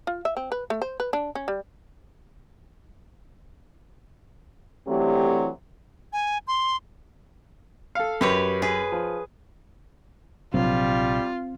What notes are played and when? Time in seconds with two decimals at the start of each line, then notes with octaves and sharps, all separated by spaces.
0.07 F4
0.25 E5
0.37 C4
0.52 B4
0.70 A3
0.82 C5
1.00 B4
1.13 D4
1.35 C#4
1.48 G3
4.87 D3 E3 F#3 A3 C4 G4
6.13 G#5
6.47 C6
7.95 A4 F5
8.21 F#2 G4 B4 C#5
8.62 G#4 B4
8.92 F3
10.54 A#1 C3 F#3 G3 C4 F4